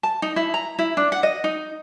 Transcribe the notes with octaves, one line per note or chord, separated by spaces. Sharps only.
A5
D#4
E4
A#5
E4
D4
F#5
D#5
D#4